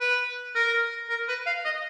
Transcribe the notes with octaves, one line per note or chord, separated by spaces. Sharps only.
B4
A#4
A#4
B4
F5
D#5